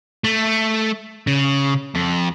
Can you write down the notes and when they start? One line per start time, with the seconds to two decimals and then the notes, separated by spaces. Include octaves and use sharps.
0.24 A3
1.27 C#3
1.95 F2